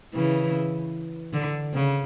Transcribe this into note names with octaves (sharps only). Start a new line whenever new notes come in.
C#3 E3
D3
C#3